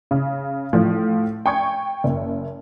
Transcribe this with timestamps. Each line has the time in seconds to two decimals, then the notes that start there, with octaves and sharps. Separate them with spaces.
0.11 C#3
0.73 A2 F3 A3
1.46 G5 C#6 G#6
2.04 F#1